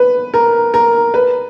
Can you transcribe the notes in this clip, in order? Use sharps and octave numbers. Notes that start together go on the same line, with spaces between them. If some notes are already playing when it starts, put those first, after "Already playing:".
Already playing: B4
A#4
A#4
B4